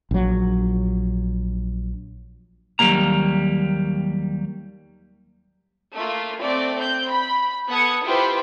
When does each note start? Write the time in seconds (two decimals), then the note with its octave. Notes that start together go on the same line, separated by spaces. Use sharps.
0.11 A#1 F#3
2.79 D#2 B2 F#3 G3 A#3 A#5
5.95 A3 A#3 F4
6.39 A3 C4 D5
6.76 C4 G6
7.07 B5
7.69 B3 A4 F#5 D#6 G#6 C#7
8.04 E4 F4 G4 B4 C5